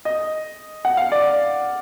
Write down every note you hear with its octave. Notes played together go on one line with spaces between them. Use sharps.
D#5
F#5
F5
D5